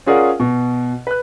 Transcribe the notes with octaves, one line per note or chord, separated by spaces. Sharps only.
C#4 F4 G#4 A#4 D5 F#5
B2
B4 F#6